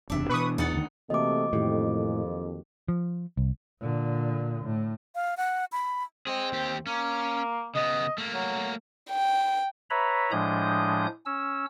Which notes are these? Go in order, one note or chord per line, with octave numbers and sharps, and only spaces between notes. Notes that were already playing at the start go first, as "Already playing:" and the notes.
F#1 E2 C3 D4 E5
B2 E3 B4 C#6 D#6
E2 D#4 F#5 A6
D2 D#3
C3 E3 A3 A#3 F#4 D#5 D6
F2 A2 D#3 G4
F3
C2
A#2 D3
A2
F5
F#5
B5
C4 G#4 D#5
D#2 G4
A#3 C#4
C#3 B3 D#5
A3 A#3
F#3
G5
B4 C#5 E5 A#5 B5
A2 F3 G#3 D4 D#6 G6
C#4 E6